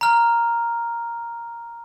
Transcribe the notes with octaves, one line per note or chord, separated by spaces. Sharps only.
A#5 F6